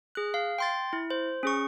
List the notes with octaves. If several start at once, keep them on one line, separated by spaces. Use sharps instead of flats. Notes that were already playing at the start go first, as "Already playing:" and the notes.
G#4 F#6
F5
G5 C6 A6
E4
C5
C#4 G#4 C#6